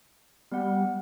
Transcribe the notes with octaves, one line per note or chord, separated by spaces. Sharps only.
G3 B3 F#5